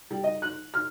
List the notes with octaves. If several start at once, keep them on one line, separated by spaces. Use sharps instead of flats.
G3
D#5
F#6
F6